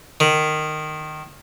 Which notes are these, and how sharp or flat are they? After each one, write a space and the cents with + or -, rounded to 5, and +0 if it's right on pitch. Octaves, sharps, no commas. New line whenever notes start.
D#3 -15